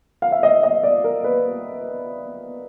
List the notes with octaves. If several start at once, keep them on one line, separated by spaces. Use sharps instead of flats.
F5
E5
D#5
D#5
D5
A#4
B4